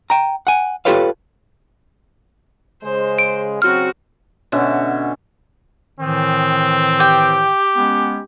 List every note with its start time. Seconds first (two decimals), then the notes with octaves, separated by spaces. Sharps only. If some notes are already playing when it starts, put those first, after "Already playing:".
0.10 G5 A#5
0.47 F#5 G#5
0.85 F4 G4 A4 B4 C#5 F5
2.83 C#3 G#3 C5
3.19 D7
3.62 C#3 F#3 C4 F#4 F6
4.52 B2 D3 C#4 E5
6.00 A2 D#3 E3 C4
7.00 G4 G5
7.77 G#3 B3 C#4